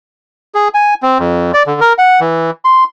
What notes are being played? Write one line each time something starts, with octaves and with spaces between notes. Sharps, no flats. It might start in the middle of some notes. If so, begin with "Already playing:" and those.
G#4
G#5
C4
F2
D5
D3
A#4
F#5
E3
C6